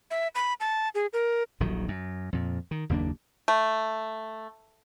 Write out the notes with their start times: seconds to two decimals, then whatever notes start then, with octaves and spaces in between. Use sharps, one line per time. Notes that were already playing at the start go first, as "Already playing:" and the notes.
0.11 E5
0.35 B5
0.60 A5
0.95 G#4
1.13 A#4
1.60 D#1 A#1 D#3 F#3
1.88 F#2
2.33 F2 A#2
2.71 D#3
2.89 F#1 D#2 A#3 D4
3.48 A3